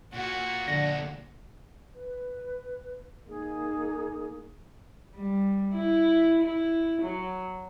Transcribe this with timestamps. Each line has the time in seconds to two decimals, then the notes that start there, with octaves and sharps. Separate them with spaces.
0.14 A#2 F#4
0.68 A#2 D3 D4 A#6
1.94 B4
3.28 A#3 D#4 G#4
5.16 G3
5.74 E4
6.41 E4
7.01 F#3